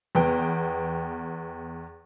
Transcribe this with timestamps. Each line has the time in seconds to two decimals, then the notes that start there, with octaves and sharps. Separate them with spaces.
0.15 E2 B3 G5